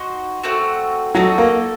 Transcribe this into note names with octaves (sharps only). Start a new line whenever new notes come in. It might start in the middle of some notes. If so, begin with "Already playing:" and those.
Already playing: D#4 F#4 C5
A3 C4 F#4
F#3 D#4 F#4 A4
A#3